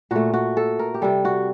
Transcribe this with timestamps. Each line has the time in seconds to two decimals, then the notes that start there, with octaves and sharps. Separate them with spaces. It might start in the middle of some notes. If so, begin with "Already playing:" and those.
0.11 A#2 A3 F#4
0.34 F#4
0.57 A4
0.79 A#4
0.94 G4
1.02 C3 G3 A4
1.25 F#4